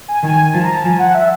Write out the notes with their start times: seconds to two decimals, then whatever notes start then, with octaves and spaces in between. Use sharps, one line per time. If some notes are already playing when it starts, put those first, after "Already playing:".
0.08 G#5
0.22 D#3 G#5
0.53 F3 A5
0.64 A#5
0.74 A5
0.84 F3 G#5
0.99 F#5
1.14 E5